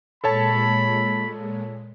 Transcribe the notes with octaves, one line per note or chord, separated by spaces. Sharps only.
A#2 G#3 A4 C#5 A5 B5